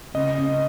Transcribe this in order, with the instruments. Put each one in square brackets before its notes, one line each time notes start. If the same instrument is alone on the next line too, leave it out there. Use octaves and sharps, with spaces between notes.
[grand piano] C#3 [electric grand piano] D#5
[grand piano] C#3